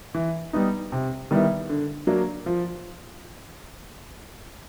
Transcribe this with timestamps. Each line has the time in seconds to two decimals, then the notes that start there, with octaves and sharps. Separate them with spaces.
0.15 E3
0.53 G3 B3 D#4
0.92 C3
1.31 D#3 G3 B3 E4
1.69 D3
2.07 F#3 A#3 D4
2.46 F3